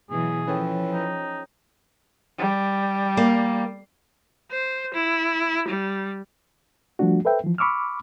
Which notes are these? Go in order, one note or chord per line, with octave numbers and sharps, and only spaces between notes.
B2 E3 F#3 G#4
E3 F3 C#4 A4 G5
D#4
G3
A#3
C5
E4
G3
F3 G3 A3 D4 F#4
A4 B4 C5 E5 G5
E3 F3
B5 C#6 D6 E6 F6